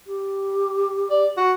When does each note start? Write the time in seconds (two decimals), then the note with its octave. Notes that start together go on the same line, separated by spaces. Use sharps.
0.07 G4
1.10 D5
1.37 F#4